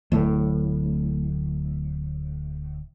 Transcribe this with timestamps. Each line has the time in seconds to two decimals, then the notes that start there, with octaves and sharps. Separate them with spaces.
0.12 D1 A2